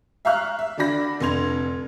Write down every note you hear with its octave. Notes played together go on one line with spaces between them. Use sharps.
E5 F5 A#5 C#6 F6 F#6
E5
D3 D4 F#4 D5 B5 A#6
F1 D3 C6 G#6 F7